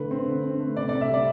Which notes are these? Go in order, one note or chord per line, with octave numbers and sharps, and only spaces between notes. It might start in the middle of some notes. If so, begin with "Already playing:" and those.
Already playing: D3 A3 B4
C4
D3
C4
A3
C3 D5
D5
C3
E5
G3 D5